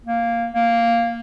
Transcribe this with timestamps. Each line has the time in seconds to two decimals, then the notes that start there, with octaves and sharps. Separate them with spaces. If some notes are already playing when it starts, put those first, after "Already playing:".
0.05 A#3
0.54 A#3